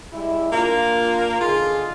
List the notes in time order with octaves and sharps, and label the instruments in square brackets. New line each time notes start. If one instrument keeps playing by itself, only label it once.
[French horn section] G3 G#3 E4
[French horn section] A#2 D4 F4 [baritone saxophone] A#3
[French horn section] D3 D#4 G#4 [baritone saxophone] F4